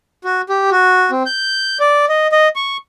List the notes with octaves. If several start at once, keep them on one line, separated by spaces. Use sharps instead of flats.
F#4
G4
F#4
C4
G6
D5
D#5
D#5
C#6